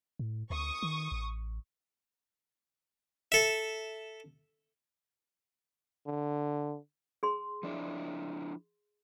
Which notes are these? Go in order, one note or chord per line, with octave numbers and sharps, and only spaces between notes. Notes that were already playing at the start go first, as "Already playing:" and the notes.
A2
D2 C#6 D#6
D#3
A1
A4 E5
D3
G#4 C6
F3 D4 E4